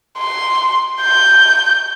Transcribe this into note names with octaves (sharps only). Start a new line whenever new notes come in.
C6
G6